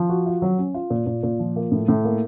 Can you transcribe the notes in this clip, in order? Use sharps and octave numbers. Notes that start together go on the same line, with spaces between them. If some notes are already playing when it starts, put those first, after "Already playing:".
Already playing: F3
F#4
F4
F#3
C#4
F4
A#2
A#2
A#2
F3
A#3
A2
A2
A#3